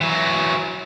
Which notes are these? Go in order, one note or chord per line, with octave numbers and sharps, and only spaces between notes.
E3 F#3